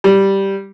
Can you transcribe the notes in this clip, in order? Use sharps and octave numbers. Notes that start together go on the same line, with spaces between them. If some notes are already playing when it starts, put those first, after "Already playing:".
G3